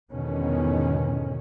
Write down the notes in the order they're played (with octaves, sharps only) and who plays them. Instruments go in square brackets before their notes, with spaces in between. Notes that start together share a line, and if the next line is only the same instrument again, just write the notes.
[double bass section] E2 G#2 B2 D3 D#3 C#4